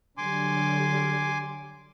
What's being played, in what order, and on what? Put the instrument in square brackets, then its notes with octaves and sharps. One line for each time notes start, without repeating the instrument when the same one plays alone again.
[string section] D3 F#3 G3 [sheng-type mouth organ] G#5 C6 D6